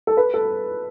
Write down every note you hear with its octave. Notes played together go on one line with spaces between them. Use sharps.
A4
B4
A4